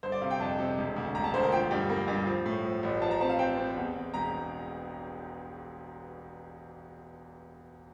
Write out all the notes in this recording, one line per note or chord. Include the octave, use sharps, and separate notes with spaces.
G1 C5
D5
C3 F5
G5
F2 A5
C3
E1
D2
E1 A#5
A5
D2 C5
A#4
F3 G5
G2
A#3
G2
F3
A2
F3
A1
F3 A5
A#5
C4 A5
F5
C4 G5
C4
E2
E2
E1 A#5
E1